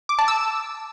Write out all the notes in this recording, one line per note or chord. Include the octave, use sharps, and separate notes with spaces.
D6
A5
E6